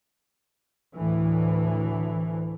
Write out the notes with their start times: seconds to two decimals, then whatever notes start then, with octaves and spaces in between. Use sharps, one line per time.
0.96 D2 A2 E3